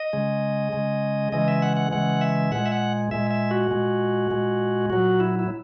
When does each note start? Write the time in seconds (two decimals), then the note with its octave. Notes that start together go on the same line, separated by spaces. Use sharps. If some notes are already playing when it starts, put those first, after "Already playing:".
Already playing: D#5
0.13 C#3 G#3
0.72 C#3 G#3
1.32 C#3 E3 G#3 D#5
1.48 E5
1.62 F#5
1.77 F#5
1.91 C#3 E3 G#3 F#5
2.21 E5
2.51 A#2 G#3 F#5
2.66 E5
2.72 F#5
3.11 A#2 G#3 E5
3.31 E5
3.51 F#4
3.71 A#2 G#3
4.31 A#2 G#3
4.90 A#2 F#3 F#4
5.20 E4
5.39 E4